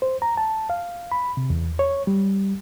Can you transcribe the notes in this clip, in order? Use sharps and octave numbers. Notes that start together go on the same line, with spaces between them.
C5
A#5
A5
F5
B5
C3
E2
C#5
G3